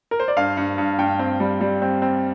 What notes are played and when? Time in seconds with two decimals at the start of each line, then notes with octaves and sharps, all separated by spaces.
0.11 A#4
0.20 C5
0.28 D5
0.37 G2 F5
0.57 G2
0.78 G2
0.98 G2 G5
1.19 C4
1.40 G3
1.61 G3
1.82 C4
2.02 C4